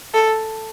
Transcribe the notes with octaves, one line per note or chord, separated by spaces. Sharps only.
A4